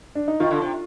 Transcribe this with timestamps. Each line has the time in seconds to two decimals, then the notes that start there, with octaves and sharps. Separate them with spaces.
0.15 D4
0.28 D#4
0.40 D#3 F4
0.51 D3
0.61 C3